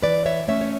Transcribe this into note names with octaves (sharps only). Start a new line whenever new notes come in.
E3 B4 D5
C#5 E5
A3 C#4 C#5 E5
C#5